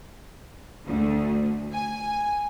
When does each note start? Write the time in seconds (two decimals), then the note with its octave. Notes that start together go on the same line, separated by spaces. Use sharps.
0.85 D2
1.72 G#5